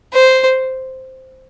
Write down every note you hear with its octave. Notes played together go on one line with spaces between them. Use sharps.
C5